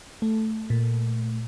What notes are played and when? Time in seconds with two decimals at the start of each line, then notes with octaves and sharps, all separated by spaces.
0.22 A3
0.70 A#2